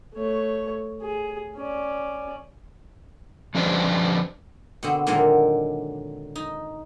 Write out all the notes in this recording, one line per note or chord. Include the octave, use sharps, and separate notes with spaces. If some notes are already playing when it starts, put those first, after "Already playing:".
A3 C#5
G#4
C#4 D5
F3 C#4 D4 B4 C5
B2 D3 C4
A#2 D3 D#3 F#3 G#3 A#3
D#4